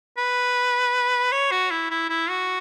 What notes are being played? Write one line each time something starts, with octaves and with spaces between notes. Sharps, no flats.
B4
C#5
F#4
E4
E4
E4
F#4